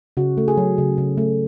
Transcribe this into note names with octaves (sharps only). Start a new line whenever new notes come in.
C#3 F#4
A3
G#4
F#3
C#3
C#3
A3